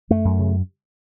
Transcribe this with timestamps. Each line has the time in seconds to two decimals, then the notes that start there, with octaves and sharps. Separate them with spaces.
0.10 F#2 A3
0.25 F#2
0.39 C#3